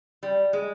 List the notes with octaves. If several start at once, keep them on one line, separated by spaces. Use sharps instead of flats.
G3
G#3